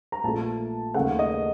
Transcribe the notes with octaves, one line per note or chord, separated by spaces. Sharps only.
A#5
A#1 A#2 A3 A5
D#2 C#3 A3 F#5
D#5